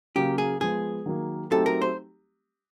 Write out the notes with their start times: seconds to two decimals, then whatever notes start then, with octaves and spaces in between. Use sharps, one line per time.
0.15 C#3 F#3 A#3 G4
0.38 G#4
0.61 F3 G#3 B3 G#4
1.06 D#3 F#3 A#3
1.51 F#3 A3 C4 D#4 G4 A4
1.66 A#4
1.82 C5